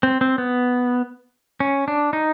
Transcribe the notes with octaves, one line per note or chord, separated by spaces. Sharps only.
C4
C4
B3
C#4
D4
D#4